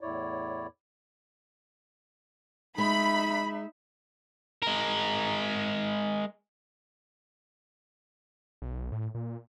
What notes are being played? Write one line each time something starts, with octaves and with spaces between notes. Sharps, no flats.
E2 A2 E4 C#5 D5
G#3 D#4 E5 B5
G#3 A#4
B1
A2
A#2